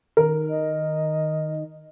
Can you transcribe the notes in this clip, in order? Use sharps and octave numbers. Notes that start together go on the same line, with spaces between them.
D#3 A#4
D#5